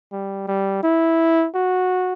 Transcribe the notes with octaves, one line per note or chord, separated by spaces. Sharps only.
G3
G3
E4
F#4